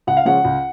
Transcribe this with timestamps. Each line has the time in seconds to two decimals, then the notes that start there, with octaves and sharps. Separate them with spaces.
0.07 C#2 F#5
0.17 F5
0.25 C#3 F3 G#3 C#4 F#5
0.44 C#2